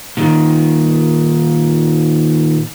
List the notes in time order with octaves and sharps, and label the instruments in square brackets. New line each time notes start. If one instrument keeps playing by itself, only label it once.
[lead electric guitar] A#2 D#3